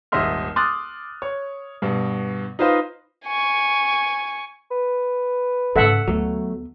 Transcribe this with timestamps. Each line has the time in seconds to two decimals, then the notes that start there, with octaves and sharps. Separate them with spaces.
0.12 D#1 G#1 D#5 E5 C6 F6
0.56 C6 D6 D#6 F6 F#6 A6
1.22 C#5
1.82 G2 B2
2.59 D#4 F4 B4 C5 D#5 F5
3.25 G#5 C#6
4.71 B4
5.76 G#2 C#3 A4 E5 F#5
6.08 D2 F#3 A3 B3